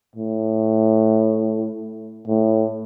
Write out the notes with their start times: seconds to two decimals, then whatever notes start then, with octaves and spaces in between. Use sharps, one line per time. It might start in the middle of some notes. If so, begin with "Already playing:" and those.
0.16 A2
2.28 A2